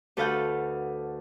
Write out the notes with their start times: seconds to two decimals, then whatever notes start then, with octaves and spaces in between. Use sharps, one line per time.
0.17 D2 A4 B4 F5 F#5 G6